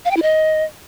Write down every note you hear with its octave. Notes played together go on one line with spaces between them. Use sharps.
F5
G5
E4
D#5